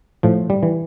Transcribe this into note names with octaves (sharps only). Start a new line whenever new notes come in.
A2 F3
G3
E3